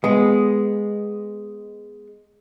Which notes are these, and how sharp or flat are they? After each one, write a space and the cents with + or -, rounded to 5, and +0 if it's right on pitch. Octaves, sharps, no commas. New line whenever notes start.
G#3 +0 B3 +5